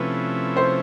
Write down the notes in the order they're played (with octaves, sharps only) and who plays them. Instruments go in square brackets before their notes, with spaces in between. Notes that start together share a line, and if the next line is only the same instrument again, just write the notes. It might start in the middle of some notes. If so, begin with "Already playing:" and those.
Already playing: [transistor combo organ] C3 F3 A3 C#4 E4 [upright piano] B4
[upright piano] C5